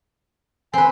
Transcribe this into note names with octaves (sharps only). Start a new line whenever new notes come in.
C4 B4 G#5